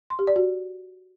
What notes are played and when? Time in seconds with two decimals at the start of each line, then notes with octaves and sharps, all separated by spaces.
0.10 C6
0.19 G4
0.27 D5
0.36 F#4